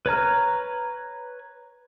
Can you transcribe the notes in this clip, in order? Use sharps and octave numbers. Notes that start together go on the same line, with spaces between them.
B4 C#5 A#5 F6